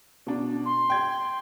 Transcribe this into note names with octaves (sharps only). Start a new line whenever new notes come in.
B2 D4
C6
G5 G#6